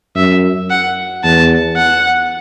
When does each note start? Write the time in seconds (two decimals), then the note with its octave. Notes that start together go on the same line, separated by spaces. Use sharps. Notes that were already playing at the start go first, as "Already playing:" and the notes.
0.16 F#2 E5
0.70 F#5
1.24 E2 A5
1.77 F#5